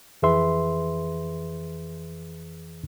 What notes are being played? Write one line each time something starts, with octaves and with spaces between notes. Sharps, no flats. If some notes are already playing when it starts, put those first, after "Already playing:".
F2 E3 G#4 B4 E5 C6